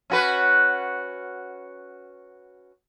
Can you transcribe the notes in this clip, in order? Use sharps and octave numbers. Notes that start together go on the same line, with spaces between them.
C#4 F#4 B4